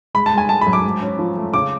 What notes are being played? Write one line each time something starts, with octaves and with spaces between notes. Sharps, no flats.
G#3 B5
A5
G#3
G#5
G#3 A5
B5
F#2
D6
G#2
C#4
F3
A3
C#3 D6